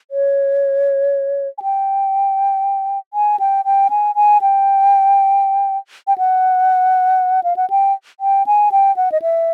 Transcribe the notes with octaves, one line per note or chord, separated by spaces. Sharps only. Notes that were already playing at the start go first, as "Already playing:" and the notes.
C#5
G#5
G5
G#5
G5
G5
G#5
G#5
G5
G5
F#5
F5
F#5
G5
G5
G#5
G5
F#5
D#5
E5